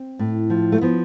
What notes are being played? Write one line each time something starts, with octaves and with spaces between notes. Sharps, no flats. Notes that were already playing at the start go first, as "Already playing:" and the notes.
Already playing: C4
A2
F3
A3
F3 B3